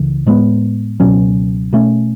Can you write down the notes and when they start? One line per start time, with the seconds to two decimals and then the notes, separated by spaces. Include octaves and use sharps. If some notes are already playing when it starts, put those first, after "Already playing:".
Already playing: C#2 C#3 E3
0.26 A2 G#3 B3
1.00 C#2 B2 F#3 C#4
1.73 B2 A3 C#4